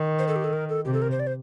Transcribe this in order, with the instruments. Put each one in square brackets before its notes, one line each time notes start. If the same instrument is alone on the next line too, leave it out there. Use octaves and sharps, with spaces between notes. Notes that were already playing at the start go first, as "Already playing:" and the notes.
Already playing: [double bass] D#3
[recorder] C5
A4
G4
A4
A#4
A4
[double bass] C3 [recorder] G4
[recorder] A4
A#4
C5
D5
C5